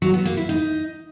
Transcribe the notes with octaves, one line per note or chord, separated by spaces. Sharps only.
F#3
B3
A#3
E4
D#4